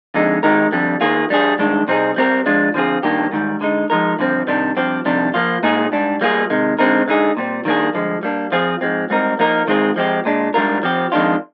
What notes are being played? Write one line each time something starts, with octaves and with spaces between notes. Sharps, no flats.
F2 D3 G#3 D#4
D#3 G#3 D#4 G4 A#4
F2 D3 G3
D#3 A#3 F4 G#4
G3 D4 G#4
G2 D#3 G#3 D4
C3 G3 C4 D#4 G#4
G3 C4 D#4 G4 A#4
F3 G#3 D4 F4
D3 F3 C4 F4 G#4
G2 D#3 A#3 D4 G4
G#2 D#3 G3
D3 G#3 D#4
F3 G#3 D#4 A#4
G2 D3 F3 C4
C3 D#3 G3 D4
G2 F3 C4 G4
F2 C3 D#3 G3 D4
F3 A#3 F4
A#2 G#3 D#4 G#4
G#2 G3 D4
G3 A#3 F4 G#4
C3 D#3 G#3
D3 G#3 C4 D#4 A#4
D3 G#3 D#4 G#4
A#2 G3 C4
D#3 G3 A#3 D4 G#4
G2 D3 F3 G#3
G3 A#3 D4
F3 C4 F4 G#4
G#2 F3 G#3 C4
G#2 G3 C4 D#4 A#4
F3 A#3 D#4 A#4
D#3 G#3 C4 F4 G#4
F3 G#3 C4 G4
A#2 G#3 D4
G#2 G3 D4 F4 A#4
F3 C4 G4
F2 D#3 G#3 D4 F4